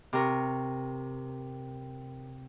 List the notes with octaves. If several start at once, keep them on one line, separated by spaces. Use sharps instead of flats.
C3 A#4 C#6